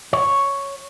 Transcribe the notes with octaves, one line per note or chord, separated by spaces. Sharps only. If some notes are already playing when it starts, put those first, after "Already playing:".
C#5